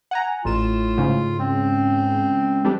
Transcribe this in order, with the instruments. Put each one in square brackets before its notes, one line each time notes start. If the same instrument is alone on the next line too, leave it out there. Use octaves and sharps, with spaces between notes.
[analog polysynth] F#5 G#5 A#5
[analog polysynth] A1 E7 [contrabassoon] A2 [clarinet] F4
[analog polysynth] G#2 C#3
[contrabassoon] C#2 [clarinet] C4
[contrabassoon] F2 [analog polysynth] G3 D4 G4